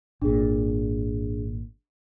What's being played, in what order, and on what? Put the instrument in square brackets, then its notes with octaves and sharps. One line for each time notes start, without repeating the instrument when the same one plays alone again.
[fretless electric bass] G#1 A#2 [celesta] D4 G#4